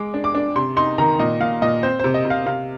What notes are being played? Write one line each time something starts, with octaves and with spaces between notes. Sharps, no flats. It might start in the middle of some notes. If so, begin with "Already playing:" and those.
Already playing: G#3 D6
D4
D6
D4
C3 C6
D#4 C6
D#3 A#5
A#2 D#5
A#2 F5
A#2 D#5
C4 C5
C3 C5
D#5
C3
F5
C3 F5